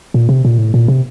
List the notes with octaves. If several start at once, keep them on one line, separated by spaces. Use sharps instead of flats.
A#2
C3
A#2
A2
A#2
C3